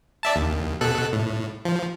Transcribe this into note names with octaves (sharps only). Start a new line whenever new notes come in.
D5 E5 A5
D#2
B2 A4 F#6
A2
F3